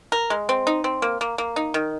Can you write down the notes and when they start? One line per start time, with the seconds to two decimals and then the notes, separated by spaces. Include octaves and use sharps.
0.12 A#4
0.30 G#3
0.49 C4
0.67 D#4
0.84 C4
1.02 A#3
1.21 A#3
1.38 A#3
1.56 D#4
1.74 D#3